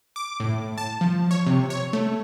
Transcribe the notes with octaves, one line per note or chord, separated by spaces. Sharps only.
D6
A2
A5
F3
C#5
C3
C#5
A3